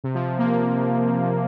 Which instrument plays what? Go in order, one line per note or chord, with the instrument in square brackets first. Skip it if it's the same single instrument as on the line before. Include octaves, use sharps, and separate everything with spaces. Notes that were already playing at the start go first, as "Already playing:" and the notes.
[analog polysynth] C3
F3
A#3